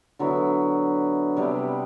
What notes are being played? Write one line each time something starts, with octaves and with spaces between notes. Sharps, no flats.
D3 F#3 B3 E4
C3 G3 B3 D4